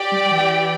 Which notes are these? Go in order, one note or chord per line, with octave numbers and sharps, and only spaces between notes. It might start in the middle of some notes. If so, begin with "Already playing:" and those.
Already playing: G4 D5 G5
G3
E3